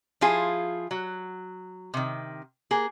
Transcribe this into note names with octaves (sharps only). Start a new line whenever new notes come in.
F3 E4 F4 G#4
F#3
C3 D#3
A#3 G#4